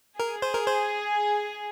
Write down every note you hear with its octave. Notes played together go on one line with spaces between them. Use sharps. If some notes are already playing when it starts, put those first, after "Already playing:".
G#4 A#4
C5
A#4
C5